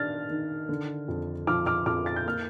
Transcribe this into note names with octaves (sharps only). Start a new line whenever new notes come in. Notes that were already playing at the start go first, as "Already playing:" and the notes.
Already playing: D#3 D4 F6 A6
D#3
D3
F2
F3 D6 F6
D6 F6
F2 D6 F6
A6
G6
A#3 F6